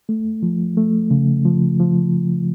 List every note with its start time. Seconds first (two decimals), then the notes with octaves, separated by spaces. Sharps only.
0.09 A3
0.43 F3
0.77 A3
1.11 C#3
1.45 F3
1.79 F3